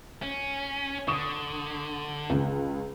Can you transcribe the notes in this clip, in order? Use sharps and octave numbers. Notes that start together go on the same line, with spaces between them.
C#4
D3 C#6 D#6 E7
C#2